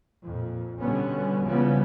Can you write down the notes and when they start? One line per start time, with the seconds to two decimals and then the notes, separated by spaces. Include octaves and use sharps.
0.23 F2 A#2
0.80 B2 D3 G3 B3 C#4
1.44 C#3 E3 F3 G3 B3 C#4